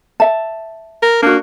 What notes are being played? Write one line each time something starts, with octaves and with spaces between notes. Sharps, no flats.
E5 A5
A#4
A#3 D4 F#4